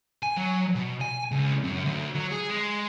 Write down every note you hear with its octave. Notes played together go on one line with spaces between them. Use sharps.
G#5
F#3
B2
G#5
C#2
F#2
D2
F#3
G#4
G#3